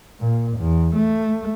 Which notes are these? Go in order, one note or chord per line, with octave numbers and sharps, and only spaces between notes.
A#2
E2
A3